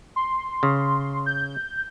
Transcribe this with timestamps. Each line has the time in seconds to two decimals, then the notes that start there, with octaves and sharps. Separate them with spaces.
0.16 C6
0.63 C#3
1.26 G6